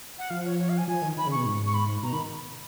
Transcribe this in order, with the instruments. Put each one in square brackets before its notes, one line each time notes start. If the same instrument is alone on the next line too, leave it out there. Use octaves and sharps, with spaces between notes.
[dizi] F#5
[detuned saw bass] F3 [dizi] F5
[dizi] C#5
C#5
F5
G#5
[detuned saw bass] F3 [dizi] G#5
[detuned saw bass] D#3
[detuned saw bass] D#3 [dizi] B5
[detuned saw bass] C#3
[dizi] C#6
[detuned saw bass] B2
G#2
[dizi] C#6
B5
[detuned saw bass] B2 [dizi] A#5
[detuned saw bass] D#3 [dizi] B5